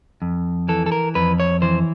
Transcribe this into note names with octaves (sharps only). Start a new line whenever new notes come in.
F2
E3 A4
A4
A#4
F2 B4
C#5
E3 C5